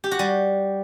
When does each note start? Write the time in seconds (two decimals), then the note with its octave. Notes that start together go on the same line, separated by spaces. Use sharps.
0.04 G4
0.11 F#4
0.19 G3